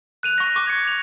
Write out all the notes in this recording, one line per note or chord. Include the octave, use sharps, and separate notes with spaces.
F#6 D#7 F7
C#6 A#6
C#6 D6
G#6 C#7
F7